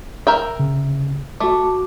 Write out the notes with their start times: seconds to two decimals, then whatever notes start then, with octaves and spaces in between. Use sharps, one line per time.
0.27 A#4 E5 G5
0.42 A#5
0.59 C#3
1.40 A3 F#4 D6